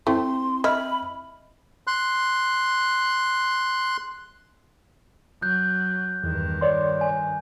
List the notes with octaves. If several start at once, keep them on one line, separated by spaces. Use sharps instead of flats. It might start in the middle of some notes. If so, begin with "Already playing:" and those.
A3 C4 E4 C6
E4 D#5 E5 B5 F6
C6 F#6
F#3 F#6 G6
E2 G2 D#3
C#5 D5 C6
G#5